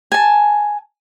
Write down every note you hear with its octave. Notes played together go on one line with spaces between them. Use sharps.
G#5 A5